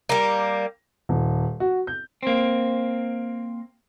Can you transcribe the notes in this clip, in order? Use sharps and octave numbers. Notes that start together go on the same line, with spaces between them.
G3 A#3
D#1
F#4
G6
A#3 C4